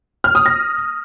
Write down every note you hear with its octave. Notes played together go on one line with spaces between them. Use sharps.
F6
D#6
A#6